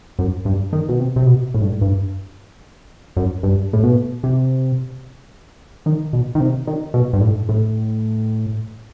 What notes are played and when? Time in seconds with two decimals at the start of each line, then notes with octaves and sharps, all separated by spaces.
0.19 F#2
0.45 G2
0.73 D#3
0.89 B2
1.00 C3
1.16 C3
1.26 B2
1.54 A2
1.62 G2
1.69 A2
1.81 G2
3.17 F#2
3.43 G2
3.73 A2
3.83 B2
4.23 C3
5.86 D#3
6.13 B2
6.35 D#3
6.40 C3
6.67 D#3
6.94 B2
7.13 G2
7.21 A2
7.49 A2